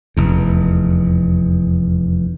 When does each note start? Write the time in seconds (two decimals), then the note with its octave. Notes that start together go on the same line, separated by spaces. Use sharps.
0.17 F1 E2